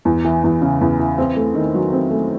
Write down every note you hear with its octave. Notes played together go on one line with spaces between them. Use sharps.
E2
E3
E2
C#3
E2
E3
C4
A3
D#3
F#3
C4
A3